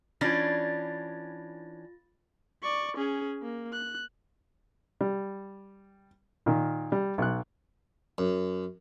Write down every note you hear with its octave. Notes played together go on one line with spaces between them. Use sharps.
E3 C#4 D4 F4 A6 A#6
D5 C#6
C#4 G#4
A#3
F#6
G3
A#2 D#3
G3
B1 F#6
F#2